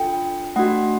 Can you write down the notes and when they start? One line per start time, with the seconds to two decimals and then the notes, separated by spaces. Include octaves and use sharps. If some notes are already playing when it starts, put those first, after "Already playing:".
Already playing: D4 F4 A4 G5
0.56 A3 D4 F#4 F#5